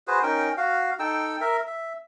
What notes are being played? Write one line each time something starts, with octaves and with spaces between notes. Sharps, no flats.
F#4 G#4 B4 C5
C#4 D#4 A#4 G5
F#4 F5
D#4 A4 G5 E6
A#4 E5
E5